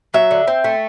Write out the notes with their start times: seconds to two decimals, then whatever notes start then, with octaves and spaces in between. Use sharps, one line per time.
0.14 F#3 E5
0.31 D3
0.47 C4
0.64 A3